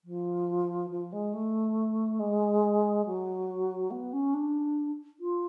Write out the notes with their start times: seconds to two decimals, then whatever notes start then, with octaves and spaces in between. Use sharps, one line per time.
0.04 F3
0.90 F3
1.12 G#3
1.33 A3
2.19 G#3
3.05 F#3
3.90 B3
4.12 C#4
4.33 D4
5.20 F4